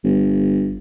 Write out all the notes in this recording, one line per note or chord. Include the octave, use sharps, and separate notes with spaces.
G1